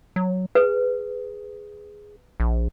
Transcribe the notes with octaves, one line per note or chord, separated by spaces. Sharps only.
F#3
G#4 B4
A#1